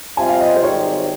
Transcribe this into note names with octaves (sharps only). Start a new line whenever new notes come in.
C3 G3 C4 F4 G#5
F5
D#5
C5
G#1 G#2 G3 C4 C#5